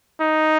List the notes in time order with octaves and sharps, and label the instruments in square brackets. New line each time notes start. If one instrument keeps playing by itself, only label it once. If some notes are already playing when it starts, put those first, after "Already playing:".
[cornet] D#4